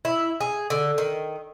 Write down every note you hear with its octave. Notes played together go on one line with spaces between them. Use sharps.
E4
G#4
D3
D#3